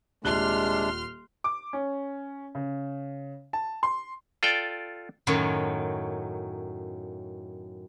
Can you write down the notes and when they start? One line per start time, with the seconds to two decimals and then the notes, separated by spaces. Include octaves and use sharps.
0.24 D#1 C3 G#3 D4 C6 F6 F#6 G7
1.44 D6
1.73 C#4
2.55 C#3
3.53 A5
3.83 C6
4.43 F4 A4 D5 G5
5.27 F#2 A2 D#3 F#3 C#5